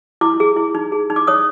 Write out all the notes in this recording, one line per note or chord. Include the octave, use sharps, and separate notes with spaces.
E4 D6
G#4
E4
D#4
G#4
D#4
D6
C#5 D#6